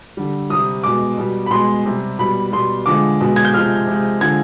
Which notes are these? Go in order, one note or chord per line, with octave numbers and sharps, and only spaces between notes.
D3 G3
C3 G3 D#6
B2 G#3 D6
B2 G3
B5
B2 G#3 C6
C3 G3
B2 G3 B5
B2 G3 C6
D3 F3 G#3 D6
B2 G#3
G#6
G6
C3 F3 G#3 F6
C3 F3 G#3
D3 F3 G#3 G#6